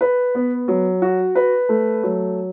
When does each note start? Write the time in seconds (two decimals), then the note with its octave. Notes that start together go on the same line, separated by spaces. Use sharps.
0.01 B4
0.35 B3
0.68 F#3
1.02 F#4
1.35 B4
1.69 A3
2.03 F#3